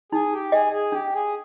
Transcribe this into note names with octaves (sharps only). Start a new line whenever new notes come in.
D#4 G#4
G4
G#4 D#5
G#4
D4 G4
G#4